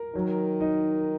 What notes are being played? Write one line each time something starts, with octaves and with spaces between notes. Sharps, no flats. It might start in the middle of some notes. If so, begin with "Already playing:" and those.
Already playing: A#4
D#3 F#3
D#4